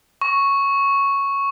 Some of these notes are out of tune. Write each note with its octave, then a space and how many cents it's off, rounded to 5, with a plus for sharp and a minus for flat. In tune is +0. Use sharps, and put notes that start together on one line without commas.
C#6 +0